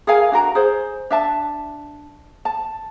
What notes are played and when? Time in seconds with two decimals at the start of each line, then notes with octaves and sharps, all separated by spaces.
0.07 G#4 A#4 F5 G#5
0.32 D4 F#4 A#4 A#5
0.55 G#4 C5
1.10 D4 E5 A5
2.45 A5